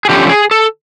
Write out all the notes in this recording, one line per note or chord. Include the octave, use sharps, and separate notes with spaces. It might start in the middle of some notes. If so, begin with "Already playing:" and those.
G#4
D3 F3 A3 C#4 G4
G#4
A4